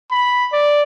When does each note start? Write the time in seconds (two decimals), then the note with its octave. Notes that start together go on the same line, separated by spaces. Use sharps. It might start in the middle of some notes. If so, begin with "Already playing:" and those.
0.11 B5
0.53 D5